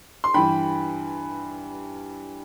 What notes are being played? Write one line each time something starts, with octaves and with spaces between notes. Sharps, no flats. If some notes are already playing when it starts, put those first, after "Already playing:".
C6
G2 E3 G5 B5